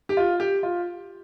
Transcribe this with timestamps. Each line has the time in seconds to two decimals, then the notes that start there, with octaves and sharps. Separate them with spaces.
0.09 G4
0.17 F4
0.40 G4
0.63 F4